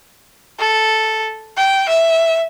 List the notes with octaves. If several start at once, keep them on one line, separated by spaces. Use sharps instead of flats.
A4
G5
E5